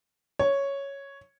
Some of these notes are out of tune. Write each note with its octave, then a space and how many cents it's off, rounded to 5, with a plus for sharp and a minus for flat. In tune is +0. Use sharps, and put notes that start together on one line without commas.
C#5 +0